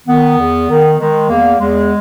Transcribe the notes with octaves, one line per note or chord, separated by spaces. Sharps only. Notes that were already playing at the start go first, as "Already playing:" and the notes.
D#3 B3
E2
D#3
D#3 G#3
E2 A#3
E2 G#3